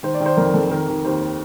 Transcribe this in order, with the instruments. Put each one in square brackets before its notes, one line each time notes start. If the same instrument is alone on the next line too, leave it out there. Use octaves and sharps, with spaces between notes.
[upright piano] D#3 C5
D5
D#3
C5
F2 A#4
F2 A4
D#3 A#4
D#3
D#2 C5